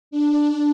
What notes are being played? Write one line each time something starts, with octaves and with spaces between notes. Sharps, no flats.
D4